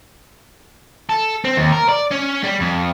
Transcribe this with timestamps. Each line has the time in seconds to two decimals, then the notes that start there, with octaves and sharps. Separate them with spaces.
1.09 A4
1.45 C4
1.57 D#2
1.72 A#4
1.89 D5
2.12 C#4
2.45 G3
2.61 F2